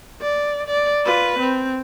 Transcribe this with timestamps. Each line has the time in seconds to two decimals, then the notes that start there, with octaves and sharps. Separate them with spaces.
0.22 D5
0.67 D5
1.06 F4 B4
1.40 C4